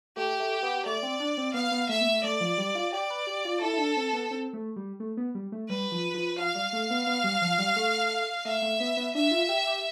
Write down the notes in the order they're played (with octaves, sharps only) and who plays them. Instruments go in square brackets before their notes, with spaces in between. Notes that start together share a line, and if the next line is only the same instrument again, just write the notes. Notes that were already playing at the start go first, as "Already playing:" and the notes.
[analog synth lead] A3 [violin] G4
[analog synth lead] A3
B3
[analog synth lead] A3 [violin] D5
[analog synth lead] C4
D4
C4
[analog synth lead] B3 [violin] F5
[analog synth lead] B3
[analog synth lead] A3 [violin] E5
[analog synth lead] B3
A3
[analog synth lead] A3 [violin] D5
[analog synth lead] F3
G3
F4
[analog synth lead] G4 [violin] D5
[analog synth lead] B4
G4
F4
[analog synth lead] E4 [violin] A4
[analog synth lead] E4
D4
C4
B3
C4
A3
G3
A3
B3
G3
A3
[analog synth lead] G3 [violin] B4
[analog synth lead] F3
F3
[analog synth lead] F3 [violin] F5
[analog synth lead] G3
A3
B3
B3
G3
F3
G3
A3
[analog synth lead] A3 [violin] E5
[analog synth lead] A3
B3
B3
[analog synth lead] D4 [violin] E5
[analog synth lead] F4
G4
G4